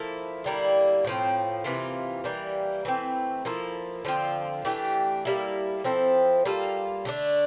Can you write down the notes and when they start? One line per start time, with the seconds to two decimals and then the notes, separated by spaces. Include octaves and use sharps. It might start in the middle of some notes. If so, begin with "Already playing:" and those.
Already playing: F3 A#3 E4 A4
0.44 D3 G3 A#3 E4
1.04 A2 F3 C4
1.64 C3 E3 A#3 F4
2.24 E3 G3 A#3
2.85 E3 A3 C4
3.45 F3 A#3 E4 A4
4.05 D3 F3 C4 F4
4.65 E3 A3 D4 G4
5.25 G3 A#3 E4 A4
5.84 F3 C4 E4 A4
6.45 G3 A#3 F4 A4
7.05 D3 A3 D4